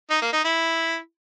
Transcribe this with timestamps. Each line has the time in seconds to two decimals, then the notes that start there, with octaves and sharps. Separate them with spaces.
0.11 D#4
0.22 A#3
0.33 D#4
0.45 E4